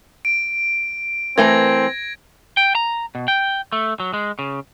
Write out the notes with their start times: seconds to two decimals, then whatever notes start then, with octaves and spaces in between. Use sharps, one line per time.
0.25 D7
1.38 E3 A3 C4 A#4 G#6 A#6
2.57 G5
2.75 A#5
3.15 B2
3.28 G5
3.72 A3
4.00 F#3
4.14 G#3
4.39 C#3